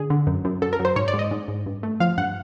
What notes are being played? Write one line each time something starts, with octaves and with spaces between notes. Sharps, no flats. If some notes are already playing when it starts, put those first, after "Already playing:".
Already playing: D3 G#4
D3
F#2
F#2
F#2 A4
A#4
F#2
C5
G#2 C#5
D5
G#2
D#5
G#2
G#2
G2
A3
F3 F5
G2 F#5